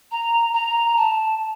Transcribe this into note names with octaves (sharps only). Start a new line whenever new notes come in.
A#5
A#5
A5